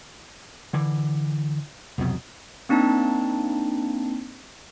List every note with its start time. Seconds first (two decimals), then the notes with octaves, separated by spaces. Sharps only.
0.73 D3 E3
1.98 C2 F2 B2 F#3
2.69 A#3 C4 D4 D#4 A5